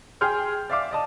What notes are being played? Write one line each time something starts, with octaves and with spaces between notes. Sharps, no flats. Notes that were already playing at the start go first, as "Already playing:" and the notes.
G#4 G5 C6 F6 G6
D5 E5 F5 D6
D5 D#5 A5